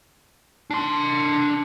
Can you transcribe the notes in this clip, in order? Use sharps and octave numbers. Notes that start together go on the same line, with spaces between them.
D4 C6